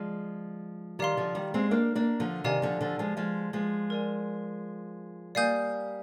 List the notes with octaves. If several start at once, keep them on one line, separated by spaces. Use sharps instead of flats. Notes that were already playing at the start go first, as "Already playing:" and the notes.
Already playing: F3 G#3 D5
D#3 G3 G4 D5 F5 C6
D3 F3
D#3 G3
G#3 C4
A#3 D4
A#3 D4
D3 F3
C3 D#3 G4 D5 F5 G#5
D3 F3
D3 F3
F3 G#3
F3 G#3
F3 G#3
A#4 D5 G#5
G3 A#3 D5 F5 G#5 D#6 G6